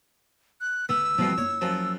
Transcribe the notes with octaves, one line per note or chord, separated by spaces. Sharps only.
F#6
D2 C#3 B3 E6
F2 B2 E3 F3 G3
F#1 F4 C#5
F#2 F3